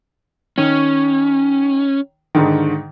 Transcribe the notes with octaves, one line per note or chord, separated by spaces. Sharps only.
D#3 C#4
G#2 D3 D#3